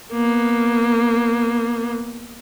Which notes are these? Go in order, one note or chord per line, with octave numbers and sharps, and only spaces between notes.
A#3 B3